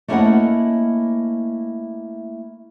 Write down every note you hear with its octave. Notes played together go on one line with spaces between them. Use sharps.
A3 A#3 C#4 E4 D#5 F#5